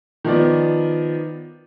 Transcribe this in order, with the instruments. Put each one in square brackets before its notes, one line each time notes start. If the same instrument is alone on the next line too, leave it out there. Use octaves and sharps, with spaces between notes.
[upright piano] D#3 F3 B3 D5